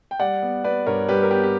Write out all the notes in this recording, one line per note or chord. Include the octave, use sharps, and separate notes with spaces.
G5
G3 D5 F#5
B3
B3 B4 D5
G2 A#4 C#5
G3 G4 B4
A#4
B3 G4 B4
G4